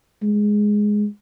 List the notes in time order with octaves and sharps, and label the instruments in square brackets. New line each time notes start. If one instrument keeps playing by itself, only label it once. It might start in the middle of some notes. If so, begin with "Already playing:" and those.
[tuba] G#3